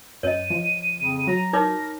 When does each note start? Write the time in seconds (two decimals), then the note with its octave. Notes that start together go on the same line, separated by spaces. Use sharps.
0.23 F#2 C#5 D#5 D#7
0.50 F3
0.98 F2 C#3
1.27 F#3 A#5
1.53 D#4 A#4 C#5 D6 A#6